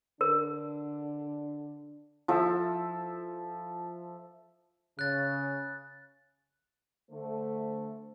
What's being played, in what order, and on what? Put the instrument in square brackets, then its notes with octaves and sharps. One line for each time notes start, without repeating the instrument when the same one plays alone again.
[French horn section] D3 D4 [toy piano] A#4
[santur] F3 A4 E5
[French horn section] C#3 [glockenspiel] F#6 A6
[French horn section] D3 A3 C5